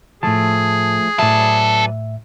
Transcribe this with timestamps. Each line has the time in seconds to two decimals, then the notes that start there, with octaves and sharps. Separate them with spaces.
0.23 A2 F3 A3 G#4 A5
1.19 A2 C#3 F#3 A4 B4 D5 E5